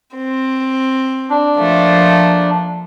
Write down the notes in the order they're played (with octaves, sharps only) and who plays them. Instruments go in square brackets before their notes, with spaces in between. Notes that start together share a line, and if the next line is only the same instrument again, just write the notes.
[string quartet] C4
[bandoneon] D4
[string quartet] F3 A3 A#3